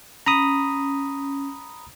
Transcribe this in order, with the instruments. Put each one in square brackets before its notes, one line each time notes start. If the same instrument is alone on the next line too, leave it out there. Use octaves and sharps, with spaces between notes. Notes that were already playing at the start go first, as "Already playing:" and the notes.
[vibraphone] C#4 [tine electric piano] A#5 B5 D#6